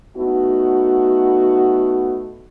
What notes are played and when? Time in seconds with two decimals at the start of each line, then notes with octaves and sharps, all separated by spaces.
0.16 A3 B3 D#4 F#4